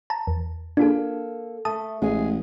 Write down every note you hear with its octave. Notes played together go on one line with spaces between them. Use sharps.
A5 A#5
E2
A#3 D4 F4 G#4 A4
A3 A5 D#6
A1 G#3 G#4